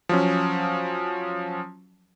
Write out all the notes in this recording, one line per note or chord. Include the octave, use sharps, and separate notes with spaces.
F3 F#3 C#4